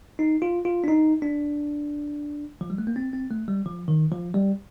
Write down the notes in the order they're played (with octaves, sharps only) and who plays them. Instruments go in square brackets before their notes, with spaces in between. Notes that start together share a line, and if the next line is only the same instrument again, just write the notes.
[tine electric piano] D#4
F4
F4
D4
D#4
D4
F3
G3
A3
A#3
C4
C4
A3
G3
F3
D#3
F3
G3